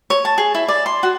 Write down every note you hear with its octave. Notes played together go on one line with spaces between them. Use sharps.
C#5
A5
G#4
E4
D5
C6
F#4